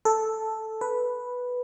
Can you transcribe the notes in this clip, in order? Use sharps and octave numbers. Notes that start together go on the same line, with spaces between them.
A4
B4